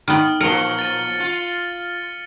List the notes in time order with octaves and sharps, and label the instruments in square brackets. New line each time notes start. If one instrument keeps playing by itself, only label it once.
[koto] D#3 B3 [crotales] F6 F#7
[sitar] A#2 F3 F#3 [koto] A#4 [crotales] C#7 G7
[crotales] A6 D#7
[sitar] F4